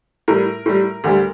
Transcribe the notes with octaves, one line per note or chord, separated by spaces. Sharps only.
A2 G3 A#4
A2 G3
D2 D3 G3